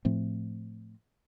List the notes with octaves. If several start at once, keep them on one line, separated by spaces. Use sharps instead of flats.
A2 F3 A3 C4